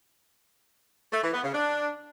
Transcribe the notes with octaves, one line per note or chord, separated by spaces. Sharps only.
A3
E3
B3
C#3
D4